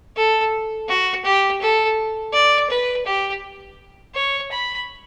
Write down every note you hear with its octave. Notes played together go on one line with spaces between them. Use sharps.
A4
F#4
G4
A4
D5
B4
G4
C#5
B5